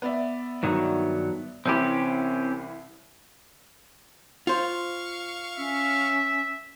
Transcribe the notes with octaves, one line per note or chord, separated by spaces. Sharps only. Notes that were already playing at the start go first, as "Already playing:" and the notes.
B3 D5 E5
G2 D#3 F#3
C2 E3 C4 C#4 G4 B5
F4 C5 F5 C#6
C#4 E5